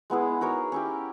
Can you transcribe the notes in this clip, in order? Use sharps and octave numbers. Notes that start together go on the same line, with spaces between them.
G#3 B3 E4 G#4
D#4 F#4 A#4 C#5
C#4 E4 G4